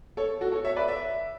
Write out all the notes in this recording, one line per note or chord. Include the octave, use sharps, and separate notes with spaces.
A4 C#5
F#4 A4
A4 C#5
C#5 E5
B4 D5
E5